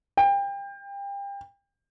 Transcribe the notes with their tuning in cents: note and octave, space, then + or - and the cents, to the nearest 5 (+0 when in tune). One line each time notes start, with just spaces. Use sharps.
G5 +30